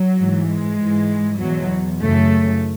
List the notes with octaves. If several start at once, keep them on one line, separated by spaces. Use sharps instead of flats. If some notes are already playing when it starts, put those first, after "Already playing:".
Already playing: F#3
G#2 E3
G#3
G#2 E3
E2 B2 F#3
F#2 C#3 E3 A3